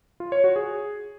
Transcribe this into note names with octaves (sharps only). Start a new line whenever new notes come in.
F4
C#5
F#4
G#4